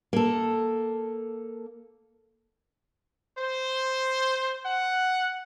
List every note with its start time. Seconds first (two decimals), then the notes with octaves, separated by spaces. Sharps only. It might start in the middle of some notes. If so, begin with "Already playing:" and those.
0.13 A#3 A4
3.36 C5
4.64 F#5